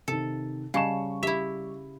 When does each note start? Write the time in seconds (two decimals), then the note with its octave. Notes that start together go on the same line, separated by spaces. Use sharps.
0.08 C3 D#3 A4
0.74 C#3 G3 D#5 F5 A5 C#6
1.23 E4 G4 E5